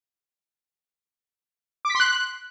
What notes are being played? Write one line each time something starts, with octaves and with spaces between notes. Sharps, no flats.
D6
B6
C6
F#6